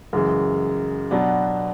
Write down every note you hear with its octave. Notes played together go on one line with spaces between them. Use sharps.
F#2 C#3 E3 G#3
B2 F#3 B3 D4